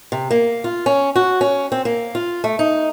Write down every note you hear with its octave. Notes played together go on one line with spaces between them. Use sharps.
C3
A#3
F4
C#4
F#4
C#4
C4
A#3
F4
A3
D#4